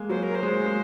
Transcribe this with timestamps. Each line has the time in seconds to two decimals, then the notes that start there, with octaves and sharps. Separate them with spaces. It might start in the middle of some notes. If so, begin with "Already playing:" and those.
Already playing: G#3 A#3
0.09 F#3 C5
0.23 A#4
0.35 C5
0.43 G#3
0.66 G#3